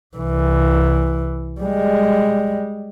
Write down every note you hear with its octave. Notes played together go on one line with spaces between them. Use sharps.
C2 E3
G3 G#3